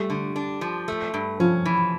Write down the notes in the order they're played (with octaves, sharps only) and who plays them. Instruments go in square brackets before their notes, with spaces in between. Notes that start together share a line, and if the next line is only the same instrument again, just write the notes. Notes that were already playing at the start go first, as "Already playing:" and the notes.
Already playing: [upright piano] G3 [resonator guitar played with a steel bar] A3
[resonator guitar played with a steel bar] D3
D4
F3
A3
G2
[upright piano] F3 [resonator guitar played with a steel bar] C#4
[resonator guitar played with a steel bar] E3